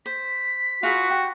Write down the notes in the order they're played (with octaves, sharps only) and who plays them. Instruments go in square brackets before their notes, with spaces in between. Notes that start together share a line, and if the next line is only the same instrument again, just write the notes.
[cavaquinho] C5 [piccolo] B6
[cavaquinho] F4 G#4 B4 [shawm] F#4
[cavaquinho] G4